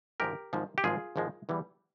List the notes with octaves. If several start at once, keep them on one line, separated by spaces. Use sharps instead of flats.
G#1 G#2 F3 G#3 G4 A#4
G#1 G#2 F3 G#3
G4
G#1 G#2 F3 G#3 F4 G#4
G#1 G#2 F3 G#3
E2 E3 G3